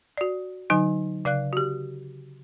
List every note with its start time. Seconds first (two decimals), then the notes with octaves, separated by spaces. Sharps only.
0.18 F#4 D5
0.70 D3 F#3 D#4 G#5
1.25 C#3 D5 F5 F#6
1.53 F#4 G4